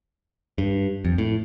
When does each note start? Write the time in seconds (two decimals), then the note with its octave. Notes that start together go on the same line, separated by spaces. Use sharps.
0.58 G2
1.05 F2
1.18 A2